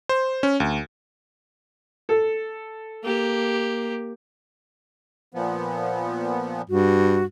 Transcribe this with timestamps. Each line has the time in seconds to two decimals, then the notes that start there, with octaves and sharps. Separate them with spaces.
0.09 C5
0.43 C#4
0.60 D2
2.09 A4
3.03 A#3 G4
5.34 A#2 F3 B3
6.70 G2 F#4